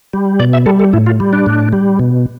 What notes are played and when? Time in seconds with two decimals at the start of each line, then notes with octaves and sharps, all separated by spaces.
0.13 G3
0.40 B2 D5
0.53 E5
0.66 G3 A4
0.79 A4
0.93 A2 E4
1.06 F4
1.20 G3
1.33 D4
1.46 A2
1.73 G3
1.99 B2